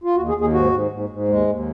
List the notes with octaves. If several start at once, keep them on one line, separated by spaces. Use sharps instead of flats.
F4
D#2 F#4
G#4
D#2
G#4
G#2 F#4
G#2
G#2
G#2
D#2 G#3
D#2